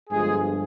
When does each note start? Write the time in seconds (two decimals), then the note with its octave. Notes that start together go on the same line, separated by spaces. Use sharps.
0.10 G1 G2 F3 G#3 G#4